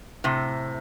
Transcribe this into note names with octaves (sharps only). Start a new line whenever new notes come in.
A2 C3